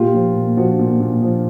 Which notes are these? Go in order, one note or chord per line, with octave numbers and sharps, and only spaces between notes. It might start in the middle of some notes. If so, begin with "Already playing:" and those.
Already playing: A#2 F4 G4
F3
A#2
F3 F#4
A#2
A#2
F3